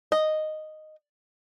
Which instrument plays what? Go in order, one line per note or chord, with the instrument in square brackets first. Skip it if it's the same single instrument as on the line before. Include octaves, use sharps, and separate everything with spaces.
[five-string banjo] D#5